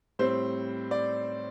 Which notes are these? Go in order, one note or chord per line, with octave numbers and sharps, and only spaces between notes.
A2 G3 C4 C5
D5